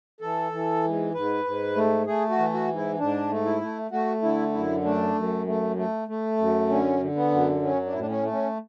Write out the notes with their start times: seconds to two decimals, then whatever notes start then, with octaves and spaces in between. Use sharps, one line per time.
0.21 E3 A4
0.52 E3
0.84 G#2
1.14 G#2 B4
1.44 G#2
1.76 A3
2.06 A3 G#4
2.29 F#4
2.38 E3
2.53 F#4
2.68 G#2
2.76 E4
2.98 G#2 D4
3.29 A3
3.45 E4
3.61 A3
3.91 A3 F#4
4.22 D3 E4
4.53 F#2 E4
4.84 A3 D4
5.15 F#2
5.46 A3
5.76 A3
6.08 A3
6.38 F#2
6.69 D3 C#4
7.01 D3
7.15 B3
7.31 F#2
7.62 F#3 C#4
7.86 D4
7.92 A2 E4
8.01 D4
8.08 C#4
8.23 A3
8.31 C#4